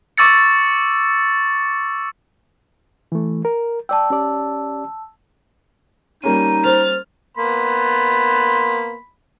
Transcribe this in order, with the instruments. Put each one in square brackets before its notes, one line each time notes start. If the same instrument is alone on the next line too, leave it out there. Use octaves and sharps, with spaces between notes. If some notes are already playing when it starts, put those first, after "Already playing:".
[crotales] C#6 D6 E6 A6 C#7
[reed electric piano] E3 A3
A#4
[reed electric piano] D5 G5 [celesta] A5 E6
[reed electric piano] C#4 G4 D5
[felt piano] G3 A#3 C#4 [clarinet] D#4 [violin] D#7
[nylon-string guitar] C5 [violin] F6 A6
[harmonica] A#3 B3 C6 [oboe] B5